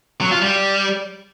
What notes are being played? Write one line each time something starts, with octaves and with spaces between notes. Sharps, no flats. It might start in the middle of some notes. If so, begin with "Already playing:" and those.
F#3
F4
G3